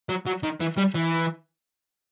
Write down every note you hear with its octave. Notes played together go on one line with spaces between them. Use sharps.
F#3
F#3
D#3
E3
G3
E3